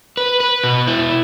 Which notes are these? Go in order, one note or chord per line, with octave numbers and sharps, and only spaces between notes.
B4
B4
B2
E4